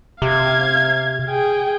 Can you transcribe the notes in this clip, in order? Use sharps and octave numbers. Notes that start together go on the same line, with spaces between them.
C3 F5 G#6
G#4 G5